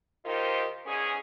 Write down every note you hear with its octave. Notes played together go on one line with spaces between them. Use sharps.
D#3 D#4 F4 G4 A#4 C5
E2 G#2 C#4 G#4